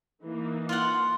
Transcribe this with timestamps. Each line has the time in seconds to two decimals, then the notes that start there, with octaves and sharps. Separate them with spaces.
0.23 E3 A#3 D#4
0.69 F4 D5 F#5